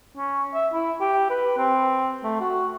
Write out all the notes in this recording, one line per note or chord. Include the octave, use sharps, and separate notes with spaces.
C#4
E5
E4
G4
B4
C4
A3
F#4